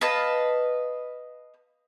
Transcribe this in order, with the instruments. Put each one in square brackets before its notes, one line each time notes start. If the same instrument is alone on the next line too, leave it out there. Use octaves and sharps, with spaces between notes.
[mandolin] B4 D#5 F5 A5